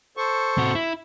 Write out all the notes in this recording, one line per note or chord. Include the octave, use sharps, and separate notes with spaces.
A4 C5 C#6
C3 F#4
E4